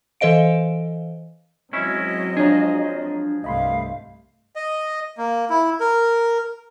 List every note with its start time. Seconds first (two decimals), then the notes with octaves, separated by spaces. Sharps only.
0.21 E3 A4 C5 D#5 F5 D7
1.73 F#3 G#3 C4 C#4 E4 D#5
2.37 F3 D4 G#4 C#5 A#5
3.44 C2 G2 A3 D#5 F5 B5 C6
4.56 D#5
5.18 A#3
5.50 E4
5.80 A#4